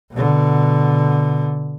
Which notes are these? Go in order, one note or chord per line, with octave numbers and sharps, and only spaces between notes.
B2 D3